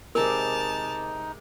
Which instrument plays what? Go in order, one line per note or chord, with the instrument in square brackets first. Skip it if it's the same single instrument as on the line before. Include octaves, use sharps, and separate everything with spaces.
[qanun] C3 G#3 D5 [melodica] D#4 [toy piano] A#4 [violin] A5 F7